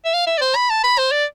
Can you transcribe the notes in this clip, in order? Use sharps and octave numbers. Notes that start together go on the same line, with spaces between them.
E5
F5
E5
D5
C5
B5
A5
B5
C5
D5